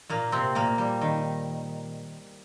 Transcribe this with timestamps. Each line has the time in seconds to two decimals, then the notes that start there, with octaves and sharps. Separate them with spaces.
0.09 A#2 A#3
0.32 C3 C4
0.55 A#2 A#3
0.78 G3
1.01 D#3